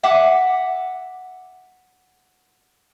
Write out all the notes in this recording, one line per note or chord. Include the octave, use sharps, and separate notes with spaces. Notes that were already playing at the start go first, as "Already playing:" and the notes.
E5 F#5 G#5 D6